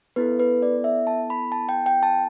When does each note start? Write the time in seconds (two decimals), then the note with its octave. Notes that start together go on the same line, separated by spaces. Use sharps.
0.16 B3 E4 A4 B4
0.39 B4
0.62 D5
0.84 E5
1.07 A5
1.30 B5
1.52 A5
1.69 G5
1.86 G5
2.03 A5